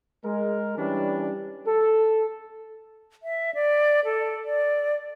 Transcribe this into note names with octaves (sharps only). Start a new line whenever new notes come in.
G#3 A#4
E3 G3 C#4 D4
A4
E5
D5
A4
D5